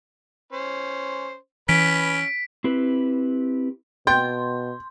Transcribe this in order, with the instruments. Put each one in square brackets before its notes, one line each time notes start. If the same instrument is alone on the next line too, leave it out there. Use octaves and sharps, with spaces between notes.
[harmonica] C#4 C5
[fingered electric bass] E3 [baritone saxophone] C#4 [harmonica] B4 [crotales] B6 D7
[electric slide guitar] C4 E4 G4 B4
[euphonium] B2 [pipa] G5 [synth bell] C6 [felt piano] G6